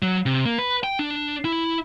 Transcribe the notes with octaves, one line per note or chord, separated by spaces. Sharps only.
F#3
C3
A#3
B4
G5
D4
E4